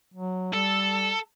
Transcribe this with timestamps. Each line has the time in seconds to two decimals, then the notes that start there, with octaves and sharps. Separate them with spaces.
0.14 F#3
0.54 G3 A4